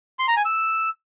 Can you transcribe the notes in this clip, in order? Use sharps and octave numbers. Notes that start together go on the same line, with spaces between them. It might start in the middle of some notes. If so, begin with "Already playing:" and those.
C6
A#5
G#5
E6